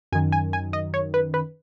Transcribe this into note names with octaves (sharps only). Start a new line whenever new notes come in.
F#2 D#3 G#5
G#5
G#5
D#5
C#5
B4
B4